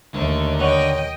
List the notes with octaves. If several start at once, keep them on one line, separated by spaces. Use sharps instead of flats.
D#2 D3 A3
C#5 D#5 F#5 G5